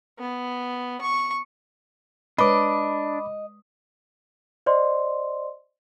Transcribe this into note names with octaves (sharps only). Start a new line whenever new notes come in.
B3
C#6
G#3 D4 B4 C#5 D#5 B5 D6
C5 D5 D#5 C6